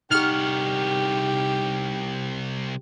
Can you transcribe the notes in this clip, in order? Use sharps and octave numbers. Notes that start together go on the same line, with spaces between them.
C2 D#4 G4 F#5 C#6 F6